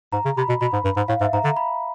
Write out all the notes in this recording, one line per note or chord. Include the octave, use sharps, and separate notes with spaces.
G#2 A#5
C#3
C3 B5
B2
B2 B5
G#2
G2
G#2
A2 F5
G#2 E5
G#2 A#5
D3 A#5
B5